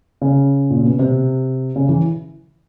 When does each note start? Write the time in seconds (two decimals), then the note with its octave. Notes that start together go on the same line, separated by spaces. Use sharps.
0.21 C#3
0.70 A#2
0.84 B2
0.99 C3
1.76 C#3
1.89 E3